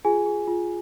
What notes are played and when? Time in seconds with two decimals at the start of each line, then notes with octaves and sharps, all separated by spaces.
0.05 F4 G#4 G#5
0.26 G#4
0.47 F4